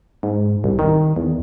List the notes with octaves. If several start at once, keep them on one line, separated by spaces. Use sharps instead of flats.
G#2
C2
D#3
E2